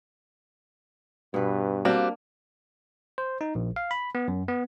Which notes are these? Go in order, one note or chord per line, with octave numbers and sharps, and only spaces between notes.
G2 B2 B4
G3 A#3 C4 D4 F#4
C5
D#4
A#1
F5
B5
B3
F#2
B3